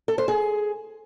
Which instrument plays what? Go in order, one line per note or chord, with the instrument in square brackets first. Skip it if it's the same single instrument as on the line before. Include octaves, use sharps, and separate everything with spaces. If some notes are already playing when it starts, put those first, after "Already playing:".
[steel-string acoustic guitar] A4
C5
G#4